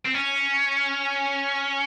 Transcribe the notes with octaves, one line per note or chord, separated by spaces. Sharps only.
C4
C#4